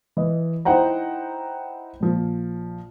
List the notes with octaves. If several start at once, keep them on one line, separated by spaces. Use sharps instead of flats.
E3 D#5
D#4 E4 C5 F#5 G5 A#5
A#1 F3